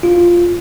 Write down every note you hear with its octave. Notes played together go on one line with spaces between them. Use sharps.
F4